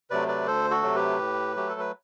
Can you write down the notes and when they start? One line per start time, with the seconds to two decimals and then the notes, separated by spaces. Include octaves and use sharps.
0.10 C3 F#3 A3 B4 D5
0.28 B4 D5
0.46 D2 A4 C5
0.70 F#4 A4
0.83 C3 F#3 A3
0.95 G4 B4
1.19 A2
1.56 F#3 A3 G4
1.69 A4
1.80 B4